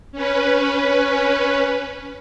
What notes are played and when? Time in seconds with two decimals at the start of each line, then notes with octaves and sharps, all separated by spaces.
0.12 C#4 B4